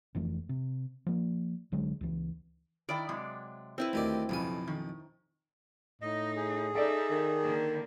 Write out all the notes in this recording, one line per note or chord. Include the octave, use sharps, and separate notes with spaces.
F1 F2 E3 A3
C3
F3 A#3
C2 D3 F#3 G#3
C#2 E3
D#3 E4 D5 G5
C3 F#3 G#3
C4 E4 B4
D2 D#3 G4 D5
B1 F2 A2 C#3 G#5
D#3
A2 D#4 D#5
G#4
D#4 A4 D5 E5
D#3
D3 A#3